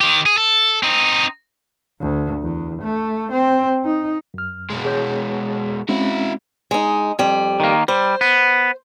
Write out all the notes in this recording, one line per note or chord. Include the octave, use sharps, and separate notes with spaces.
D#3 G4
G#4
A4
C4 D#4
D2
E2
A3
C4
D#4
F#2 F6
B2 G#3
G#4 C#5 G6
G#3 C4 C#4 E4 F#4
G#3 D#4
F2 G3
D#3 A#3
G3 C5
B3